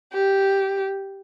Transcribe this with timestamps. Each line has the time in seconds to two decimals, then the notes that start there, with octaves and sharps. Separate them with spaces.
0.13 G4